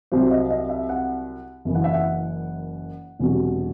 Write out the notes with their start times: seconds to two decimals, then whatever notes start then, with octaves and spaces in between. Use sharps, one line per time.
0.12 C2 C3 F#3 C5
0.31 D#5
0.50 D#5
0.69 E5
0.89 F#5
1.65 F#1 F#2 E3
1.75 F#5
1.84 E5
1.94 F#5
3.19 E1 E2 C3 F#3